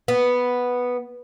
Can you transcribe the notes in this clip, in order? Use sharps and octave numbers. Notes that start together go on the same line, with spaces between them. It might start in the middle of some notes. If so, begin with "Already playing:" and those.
B3